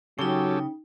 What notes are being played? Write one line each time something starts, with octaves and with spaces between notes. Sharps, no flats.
C#3 F#3 C#4 D#4 G4 A4 G5